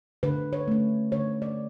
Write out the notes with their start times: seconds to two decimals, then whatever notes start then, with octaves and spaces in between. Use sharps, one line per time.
0.23 D3 B4
0.53 C#5
0.68 A3 C#4
1.12 D3 C#5
1.42 D5